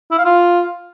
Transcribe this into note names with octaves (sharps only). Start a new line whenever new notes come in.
E4
F5
F4